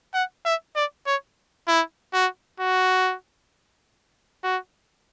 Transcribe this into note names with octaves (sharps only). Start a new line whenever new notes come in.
F#5
E5
D5
C#5
E4
F#4
F#4
F#4